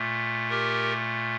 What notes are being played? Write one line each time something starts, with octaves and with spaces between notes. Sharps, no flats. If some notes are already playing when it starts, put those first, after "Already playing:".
Already playing: A#2 A3
G4 A#4